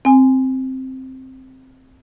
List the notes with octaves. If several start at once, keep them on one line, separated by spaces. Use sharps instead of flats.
C4 G#5